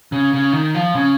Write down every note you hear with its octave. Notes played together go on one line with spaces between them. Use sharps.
C#3
C#3
D#3
F3
C#3